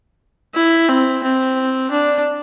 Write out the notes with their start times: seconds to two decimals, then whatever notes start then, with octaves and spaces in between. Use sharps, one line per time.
0.55 E4
0.89 C4
1.23 C4
1.91 D4